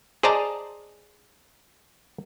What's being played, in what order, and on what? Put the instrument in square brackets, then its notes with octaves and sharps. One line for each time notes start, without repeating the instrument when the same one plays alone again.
[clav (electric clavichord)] G#4 C5 D5 D#5 A5 A#5